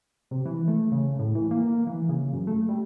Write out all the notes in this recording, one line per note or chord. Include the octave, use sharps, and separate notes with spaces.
C3
E3
A3
C#3
A2
E3
A#3
E3
C#3
F#2
A3
G3